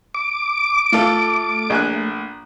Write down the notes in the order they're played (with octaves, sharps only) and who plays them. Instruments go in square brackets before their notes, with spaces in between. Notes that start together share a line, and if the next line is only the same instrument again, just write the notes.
[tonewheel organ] D6
[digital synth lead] A3 [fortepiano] F4 A4
[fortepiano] A#1 G#5 F#6